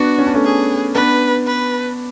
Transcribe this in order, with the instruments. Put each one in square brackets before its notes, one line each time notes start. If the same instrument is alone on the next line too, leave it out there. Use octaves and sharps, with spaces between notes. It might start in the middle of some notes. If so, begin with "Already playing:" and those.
Already playing: [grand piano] B3 D4 [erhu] F#4
[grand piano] C#4
D4
A3 C#4
[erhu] G#4
[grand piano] B3 D4 [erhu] B4
[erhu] B4